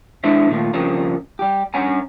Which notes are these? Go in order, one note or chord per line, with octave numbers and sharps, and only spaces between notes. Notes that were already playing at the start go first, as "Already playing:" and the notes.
G#3 D4 E4 A4 C5 E5
A#2 D#3 A3 F4
C#3 F3 G3 A#3 C4 A#4
G3 G4
G2 C#4 F#5 G#5 A#5